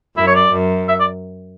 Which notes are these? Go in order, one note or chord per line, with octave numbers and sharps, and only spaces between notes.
F#2 E4
C#5
D5
F#2
E5
D5